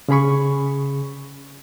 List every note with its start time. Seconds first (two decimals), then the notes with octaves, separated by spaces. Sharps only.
0.08 C#3 C#4 G#4 B5 C#6